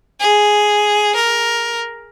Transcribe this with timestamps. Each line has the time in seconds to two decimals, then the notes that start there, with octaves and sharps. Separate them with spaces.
0.20 G#4
1.15 A#4